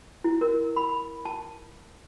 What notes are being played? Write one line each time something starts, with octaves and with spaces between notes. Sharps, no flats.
E4
A#4
B5
A5